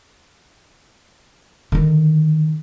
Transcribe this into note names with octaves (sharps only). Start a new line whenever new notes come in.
D3 D#3